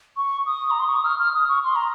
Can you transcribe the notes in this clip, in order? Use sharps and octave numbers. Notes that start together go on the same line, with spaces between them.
C#6
D#6
A#5
C6
C#6
D#6
F6
F6
D#6
C#6
C6
A#5